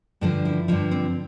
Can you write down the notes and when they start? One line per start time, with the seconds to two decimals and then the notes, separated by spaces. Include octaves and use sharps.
0.21 G2 D3 F3 D4
0.45 E4
0.68 G2 D3 F3 D4
0.91 C4